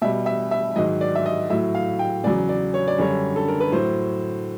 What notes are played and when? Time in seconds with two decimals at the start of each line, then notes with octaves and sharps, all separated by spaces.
0.02 B2 G3 E5
0.26 E5
0.51 E5
0.76 G#2 D#3 F#3 D#5
1.01 D5
1.15 E5
1.26 D#5
1.50 A2 F#3 E5
1.75 F5
1.99 G5
2.24 E2 C#3 F#3 D5
2.49 D5
2.74 C#5
2.88 D5
2.98 F#2 D3 G3 C#5
3.36 A4
3.48 A#4
3.60 B4
3.72 A2 F#3 C5